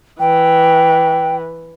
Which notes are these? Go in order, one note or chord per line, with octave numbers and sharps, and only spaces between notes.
E3 G5